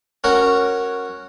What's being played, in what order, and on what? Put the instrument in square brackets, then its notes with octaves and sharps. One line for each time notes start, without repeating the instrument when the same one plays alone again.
[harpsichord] C#4 F#4 A#4